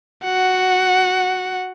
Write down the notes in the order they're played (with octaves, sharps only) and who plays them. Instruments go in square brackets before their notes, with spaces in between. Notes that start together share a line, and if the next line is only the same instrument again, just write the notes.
[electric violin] F#4 F#5